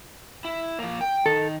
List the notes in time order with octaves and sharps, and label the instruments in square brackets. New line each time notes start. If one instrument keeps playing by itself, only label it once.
[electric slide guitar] E4
F3 A#3
G5
[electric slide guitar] D#3 [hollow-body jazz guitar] A4